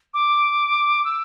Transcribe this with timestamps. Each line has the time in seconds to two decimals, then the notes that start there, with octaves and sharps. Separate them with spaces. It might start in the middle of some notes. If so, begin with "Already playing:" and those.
0.14 D6
1.05 E6